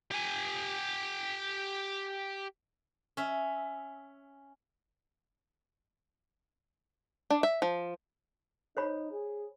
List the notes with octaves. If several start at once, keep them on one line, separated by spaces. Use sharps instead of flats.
G4 G#5
C#4 E5
D4
E5
F3
D#4 C5 C#5 B5
G#4